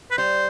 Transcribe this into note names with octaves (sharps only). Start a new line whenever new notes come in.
B4
G3 C5